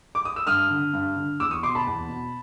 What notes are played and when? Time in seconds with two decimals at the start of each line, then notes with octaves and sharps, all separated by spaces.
0.15 D6
0.25 D#6
0.36 E6
0.47 G2 D#6 F6
0.70 D3
0.93 G2
1.16 D3
1.40 E2 D6 E6
1.51 C#6 D#6
1.63 B2 C6 D6
1.75 A5 B5
1.87 E2
2.09 B2